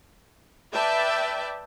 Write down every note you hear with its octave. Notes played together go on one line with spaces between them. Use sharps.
B4 D5 E5 G5 A5